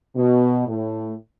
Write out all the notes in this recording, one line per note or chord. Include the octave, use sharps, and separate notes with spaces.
B2
A2